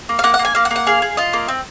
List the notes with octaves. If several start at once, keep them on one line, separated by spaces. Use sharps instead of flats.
A#3
F5
A#3 F#5
F#5
A#3
G#5
A#3 F5
F#5
A#3
F#5
G#4 F5
G#4
F4 D#5
A#3
C4